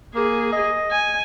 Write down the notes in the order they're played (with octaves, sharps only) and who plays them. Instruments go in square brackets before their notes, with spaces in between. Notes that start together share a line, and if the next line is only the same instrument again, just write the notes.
[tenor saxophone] A#3 [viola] G#4
[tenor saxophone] D#5
[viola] G#5